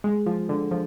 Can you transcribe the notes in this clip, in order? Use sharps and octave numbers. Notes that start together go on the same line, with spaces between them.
G#3
F3
D3
F3